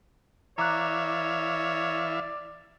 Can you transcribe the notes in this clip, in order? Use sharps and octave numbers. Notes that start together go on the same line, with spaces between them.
E3 C#5 D5 E5 F5 A#5 D6 F#6